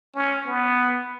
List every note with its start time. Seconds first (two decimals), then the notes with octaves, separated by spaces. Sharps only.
0.16 C#4
0.47 B3